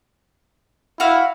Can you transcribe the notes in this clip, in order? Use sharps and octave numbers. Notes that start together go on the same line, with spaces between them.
E4 F#4 F5